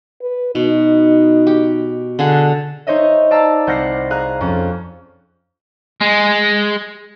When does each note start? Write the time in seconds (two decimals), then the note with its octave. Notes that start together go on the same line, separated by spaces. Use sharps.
0.22 B4
0.55 B2 D#4
1.47 G4
2.19 D3 G#4 F#5
2.87 D#4 C5 C#5 D#5 E5
3.31 D5 F5 A5 A#5 E6
3.67 C2 C5 F#5 F6 A#6 C7
4.10 G#4 F5 A#5 F#6
4.40 F2 C#4
6.01 G#3